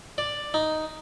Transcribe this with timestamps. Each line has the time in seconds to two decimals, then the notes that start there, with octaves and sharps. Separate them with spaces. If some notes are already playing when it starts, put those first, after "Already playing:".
0.18 D5
0.54 D#4